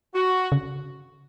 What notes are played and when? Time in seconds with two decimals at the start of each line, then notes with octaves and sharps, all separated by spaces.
0.14 F#4
0.52 C#3